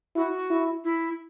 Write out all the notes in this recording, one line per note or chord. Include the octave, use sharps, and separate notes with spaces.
E4 F#4
E4
E4